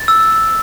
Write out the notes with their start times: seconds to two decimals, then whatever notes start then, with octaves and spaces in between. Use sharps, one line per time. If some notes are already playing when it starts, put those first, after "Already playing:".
Already playing: A6
0.08 E6